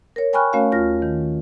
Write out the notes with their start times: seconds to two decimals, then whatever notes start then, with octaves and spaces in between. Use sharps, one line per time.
0.16 A#4 C#5
0.33 G5 G#5 B5 C#6 F6 F#6
0.53 A3 C#4 F#4 A#4 C#5 F5
0.72 D#2 F4 F6 A#6
1.02 D#3